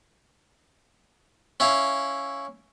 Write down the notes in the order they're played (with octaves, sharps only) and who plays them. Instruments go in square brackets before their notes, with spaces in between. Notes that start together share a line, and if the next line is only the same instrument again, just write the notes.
[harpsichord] C#4 E4 F5